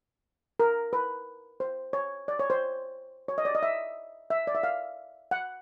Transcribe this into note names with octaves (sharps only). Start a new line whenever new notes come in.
A#4
B4
C5
C#5
D5
C#5
C5
C#5
D#5
D5
D#5
E5
E5
D5
E5
F5
F#5